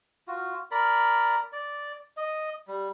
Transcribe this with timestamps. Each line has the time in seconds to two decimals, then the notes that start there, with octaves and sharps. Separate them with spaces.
0.28 F4 F#4
0.71 A#4 D5 B5
1.52 D5
2.17 D#5
2.68 G3